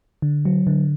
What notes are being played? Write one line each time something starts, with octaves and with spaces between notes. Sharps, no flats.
D3
F#3
D3